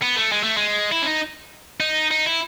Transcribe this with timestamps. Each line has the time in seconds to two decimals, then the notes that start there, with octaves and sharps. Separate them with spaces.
0.02 B3
0.16 A3
0.32 G#3
0.44 A3
0.57 G#3
0.92 E4
1.02 C#4
1.07 D#4
1.80 D#4
2.11 D#4
2.26 E4